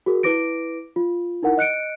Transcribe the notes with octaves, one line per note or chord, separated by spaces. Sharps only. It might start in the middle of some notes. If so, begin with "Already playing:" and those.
F#4 G#4 A#4
E4 B4 D6 A#6 D7
F4
D#4 E4 A#4 F#5
D#5 F#6 C#7 D7